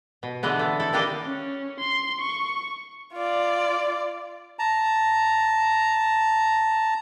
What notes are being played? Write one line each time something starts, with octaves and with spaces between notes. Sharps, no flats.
B2
D3 E3 G#3 B3
A3
E4 A4
G3 A#3 D4 G4 D#5
C#4
C6
C#6
F4 D5
A5 A#5